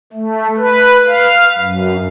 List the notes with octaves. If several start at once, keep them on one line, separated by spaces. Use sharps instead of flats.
A3
B4
F5
F#2